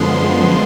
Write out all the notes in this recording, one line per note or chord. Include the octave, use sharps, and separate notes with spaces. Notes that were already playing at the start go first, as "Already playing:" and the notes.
Already playing: F#2 D3 F3 G#3 B3 C6